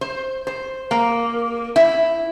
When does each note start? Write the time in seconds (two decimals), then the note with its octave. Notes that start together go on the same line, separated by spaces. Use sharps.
0.01 C5
0.47 C5
0.91 A#3
1.76 E4